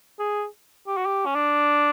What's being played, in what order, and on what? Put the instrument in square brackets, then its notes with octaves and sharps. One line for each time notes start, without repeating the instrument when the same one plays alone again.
[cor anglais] G#4
G4
F#4
G4
C#4
D4